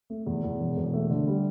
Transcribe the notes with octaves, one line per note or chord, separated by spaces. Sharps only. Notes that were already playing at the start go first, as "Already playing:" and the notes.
A3
E2
E2
E1
E1
A3
D3
G3